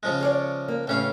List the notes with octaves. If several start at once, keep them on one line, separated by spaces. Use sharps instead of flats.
C#3 F3 G#3
G#4 C#5 D5
A#3
A1 A2 C#3 C4 C#4 F5